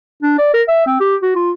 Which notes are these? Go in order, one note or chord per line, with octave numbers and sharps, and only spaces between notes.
D4
D5
A#4
E5
C4
G4
F#4
F4